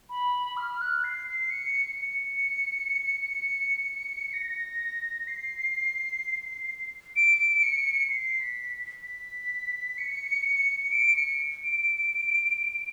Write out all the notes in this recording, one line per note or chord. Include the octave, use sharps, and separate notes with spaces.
B5
F6
F#6
C7
C7
C#7
C#7
A#6
C7
D7
C#7
C7
B6
B6
C#7
D7
C#7
D7